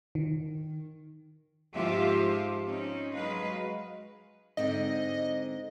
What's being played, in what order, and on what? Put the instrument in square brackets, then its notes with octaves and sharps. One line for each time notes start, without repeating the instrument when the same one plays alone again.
[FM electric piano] D#3
[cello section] G#2 F3 F4 G4 E5
C4 C#4 D#4
F#3 G#3 B4 D#5 F5
[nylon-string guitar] G#2 D3 C4 [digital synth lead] D#5